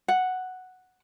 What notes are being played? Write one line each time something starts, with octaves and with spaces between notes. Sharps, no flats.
F#5